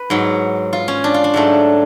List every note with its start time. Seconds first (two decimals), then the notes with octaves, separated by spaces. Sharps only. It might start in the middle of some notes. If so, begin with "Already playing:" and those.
Already playing: B4
0.10 G#2 F#3
0.73 F4
0.88 C#4
1.04 D4
1.14 F4
1.24 D4
1.34 G#2 F#3 A3